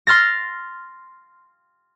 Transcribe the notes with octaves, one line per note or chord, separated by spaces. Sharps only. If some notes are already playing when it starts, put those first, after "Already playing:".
C6 F6 A6 A#6